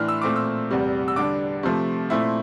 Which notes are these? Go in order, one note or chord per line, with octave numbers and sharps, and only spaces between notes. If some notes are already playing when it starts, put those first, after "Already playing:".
Already playing: A2 E3 D4 C6 F6
E6
A#2 A3 C4 D6
E6
E2 C3 G3
E6
D3 G3 D4 D6
C3 F3 A3
A#2 A3 C4 E4